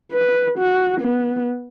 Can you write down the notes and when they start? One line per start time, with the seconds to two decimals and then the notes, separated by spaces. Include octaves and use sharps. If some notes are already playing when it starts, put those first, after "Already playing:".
0.12 B4
0.58 F#4
1.01 B3